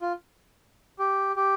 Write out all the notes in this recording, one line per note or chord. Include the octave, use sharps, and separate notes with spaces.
F4
G4
G4